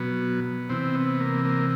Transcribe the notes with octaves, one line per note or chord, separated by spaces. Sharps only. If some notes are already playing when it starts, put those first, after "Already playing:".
Already playing: B2 F#3 B3
C3 E3 C4
B3
A#3
A#3